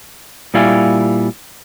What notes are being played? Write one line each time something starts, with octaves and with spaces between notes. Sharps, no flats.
A#2 G3 E4 D5 F5 G#5